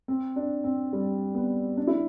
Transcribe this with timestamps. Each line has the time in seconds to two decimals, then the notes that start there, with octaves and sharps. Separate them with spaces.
0.08 C4
0.36 D4
0.64 C4
0.93 G3
1.35 B3
1.77 D4
1.87 E4